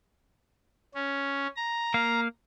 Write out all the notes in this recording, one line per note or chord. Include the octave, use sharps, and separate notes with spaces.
C#4
A#5
A#3 F5